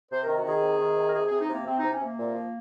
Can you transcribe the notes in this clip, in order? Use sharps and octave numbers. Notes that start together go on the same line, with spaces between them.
C3 C5
D#3 A#4
F#4
D#3 G#4
C3
D#3
C3
A#4
C3 G#4
C3 G#4
D#4
C3 A#3
C3 C4
C3 D#4
C#4
C3 A#3
A#2
F3